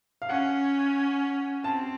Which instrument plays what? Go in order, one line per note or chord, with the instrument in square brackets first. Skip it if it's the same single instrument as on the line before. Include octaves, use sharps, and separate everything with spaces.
[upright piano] F5
[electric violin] C#4 [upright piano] F#5
[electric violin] C4 [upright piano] A5